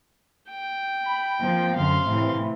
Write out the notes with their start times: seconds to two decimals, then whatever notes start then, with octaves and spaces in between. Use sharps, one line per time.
0.50 G5
1.05 B5
1.39 F3 A#3 C4
1.76 F#2 D3 F5 C6
2.06 A2 C3 E3